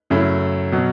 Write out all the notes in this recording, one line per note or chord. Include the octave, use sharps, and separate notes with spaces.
F#2 C#3 F#3 A3 E4
B2 F#3